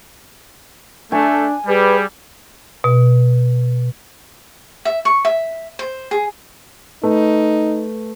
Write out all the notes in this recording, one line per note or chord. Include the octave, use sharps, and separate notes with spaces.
A3 D4 G#5
G3 G#4 B4
B2
E5
C#6
E5
C5
G#4
A3 D#4 B4